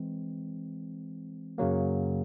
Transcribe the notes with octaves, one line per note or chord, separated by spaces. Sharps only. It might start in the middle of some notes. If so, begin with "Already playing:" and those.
Already playing: E3 G#3 C4
F#2 C#3 F#3 A#3